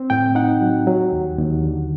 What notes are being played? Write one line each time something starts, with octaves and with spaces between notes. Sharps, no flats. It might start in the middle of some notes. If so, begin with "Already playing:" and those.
Already playing: C4
A2 G5
D#4 F#5
F#3
F#3
D#2
D#2
D3